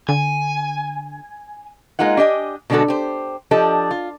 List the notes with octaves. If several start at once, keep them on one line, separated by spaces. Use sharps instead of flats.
D3 G#5
G#3 A#3 D#4 F4 F#5
D4 G4 D#5 G#5
B2 D3 G#3 D4 F#4 A4
G4 C5
F3 D4 G4 A4 D#5
F4